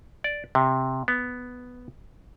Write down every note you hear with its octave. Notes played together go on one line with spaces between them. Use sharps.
D5
C3
B3